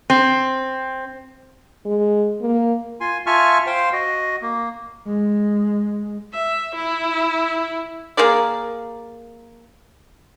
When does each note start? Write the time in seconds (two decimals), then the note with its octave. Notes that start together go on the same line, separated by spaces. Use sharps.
0.10 C4
1.86 G#3
2.41 A#3
3.00 F4 G#5 C6
3.26 F4 E5 G#5 A5 C#6 F6
3.67 C5 F5 G5 C6
3.93 F#4 D#5
4.42 A#3
5.07 G#3
6.33 E5
6.75 E4
8.17 A#3 G#4 A#4 D5